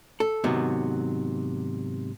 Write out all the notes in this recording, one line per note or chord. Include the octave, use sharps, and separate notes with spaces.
A4
G#2 C3 D#3 F#3 B3